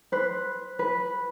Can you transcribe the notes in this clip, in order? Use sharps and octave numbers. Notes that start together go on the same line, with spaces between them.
B4 C5
B4